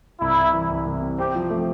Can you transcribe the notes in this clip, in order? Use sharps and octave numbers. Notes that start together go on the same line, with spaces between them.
C2 E4
C3
E3
C2
C2
C3
C4 G4
F3
A3